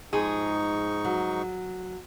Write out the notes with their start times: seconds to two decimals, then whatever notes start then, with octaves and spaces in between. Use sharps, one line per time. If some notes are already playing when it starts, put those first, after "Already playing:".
0.13 G#2 F3 D#4 G#4 C#6
1.05 F#3